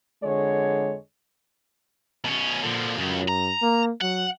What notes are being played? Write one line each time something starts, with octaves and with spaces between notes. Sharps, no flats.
F2 D3 G#3 C#5
B2 C#4
A#2 D3 F3
C#2 F#2 C#3
A#5
A#3
F#3 F#5